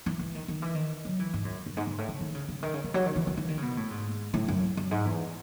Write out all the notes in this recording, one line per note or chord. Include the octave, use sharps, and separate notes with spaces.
E3
E3
D#3
D#3
E3
D#3
F#3
E3
G#2
F#2
F#2
G#2
G#2
A2
C#3
D#3
C#3
C#3
D#3
C#3
C#3
F#3
D#3
E3
E3
E3
D#3
C#3
B2
A2
G#2
A2
F#2
F#2
G#2
E2